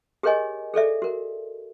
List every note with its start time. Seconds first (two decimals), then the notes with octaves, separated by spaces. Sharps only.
0.23 G4 G#4 A#4 C#5 D#5 G#5
0.74 G#4 A4 D5 E5
1.02 F#4 A#4